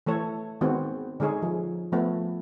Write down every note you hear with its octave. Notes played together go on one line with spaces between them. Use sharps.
E3 A3 A4 C#5
D#3 G#3 B3 C4 F#4
D3 G#3 D#4 G#4 C#5
F3
F3 A3 B3